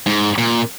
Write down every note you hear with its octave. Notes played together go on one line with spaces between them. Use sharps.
G#2
A#2